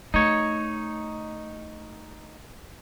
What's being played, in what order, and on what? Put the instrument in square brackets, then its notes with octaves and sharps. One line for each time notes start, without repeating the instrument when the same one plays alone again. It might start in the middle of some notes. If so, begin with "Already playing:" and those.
[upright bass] A3 [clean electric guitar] D#4 C#5